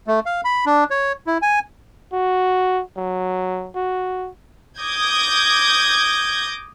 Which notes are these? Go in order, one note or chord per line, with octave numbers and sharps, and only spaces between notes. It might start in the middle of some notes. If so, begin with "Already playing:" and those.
A3
F5
B5
D4
C#5
E4
G#5
F#4
F#3
F#4
D6 D#6 G6 G#6 A#6